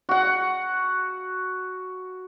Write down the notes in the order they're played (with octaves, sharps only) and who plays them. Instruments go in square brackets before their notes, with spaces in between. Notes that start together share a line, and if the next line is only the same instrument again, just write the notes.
[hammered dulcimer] F#4 F#5